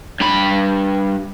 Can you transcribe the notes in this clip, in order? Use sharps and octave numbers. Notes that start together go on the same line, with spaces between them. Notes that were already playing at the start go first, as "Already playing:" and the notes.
G2 B5